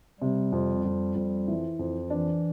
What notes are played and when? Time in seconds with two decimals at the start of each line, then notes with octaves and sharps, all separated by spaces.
0.20 C3 G3
0.52 F2
0.85 F2
1.15 F2
1.48 E3
1.79 F2
2.10 E3 D4